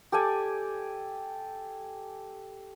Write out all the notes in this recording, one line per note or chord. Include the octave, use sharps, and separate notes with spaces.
G4 A4 D5 G#5